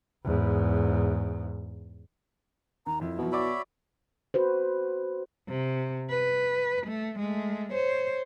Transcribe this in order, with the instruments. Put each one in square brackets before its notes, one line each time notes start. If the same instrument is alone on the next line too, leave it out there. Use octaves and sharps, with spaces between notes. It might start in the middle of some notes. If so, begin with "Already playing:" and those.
[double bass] E2 G#2
[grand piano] D#2 [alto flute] A#5
[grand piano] F2 [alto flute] E4
[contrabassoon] B2 [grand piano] F3 F#3
[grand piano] F#4 D5 D6 [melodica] C#5 E5 B5
[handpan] F#4 B4 C5
[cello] C3
B4
A3
G#3 A3
C5 C#5